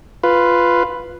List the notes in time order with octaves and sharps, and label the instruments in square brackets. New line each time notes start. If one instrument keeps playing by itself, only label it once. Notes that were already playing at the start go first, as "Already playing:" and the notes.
[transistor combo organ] F4 B4